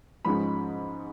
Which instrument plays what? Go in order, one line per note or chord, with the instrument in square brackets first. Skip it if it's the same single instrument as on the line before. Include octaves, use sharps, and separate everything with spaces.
[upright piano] G#2 F3 G#3 C#4 B5